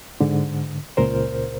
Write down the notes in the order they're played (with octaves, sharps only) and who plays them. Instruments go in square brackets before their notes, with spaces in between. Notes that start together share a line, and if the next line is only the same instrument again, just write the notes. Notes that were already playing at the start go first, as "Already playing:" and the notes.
[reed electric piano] G#2 D3
C#2 A#2 A#4 C5